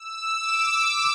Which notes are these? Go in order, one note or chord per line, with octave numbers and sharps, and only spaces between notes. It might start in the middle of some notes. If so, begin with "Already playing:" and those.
Already playing: E6
D6